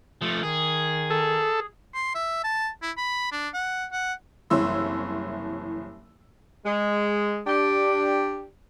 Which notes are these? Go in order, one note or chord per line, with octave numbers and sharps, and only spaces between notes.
F3 A3
D#3 G#4
A4
C6
E5
A5
E4
B5
D4
F#5
F#5
F#1 C2 E3 C#5 C6 E6
G#3
D4 G4